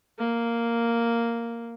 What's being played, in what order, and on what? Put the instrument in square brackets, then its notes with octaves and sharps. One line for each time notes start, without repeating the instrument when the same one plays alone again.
[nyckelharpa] A#3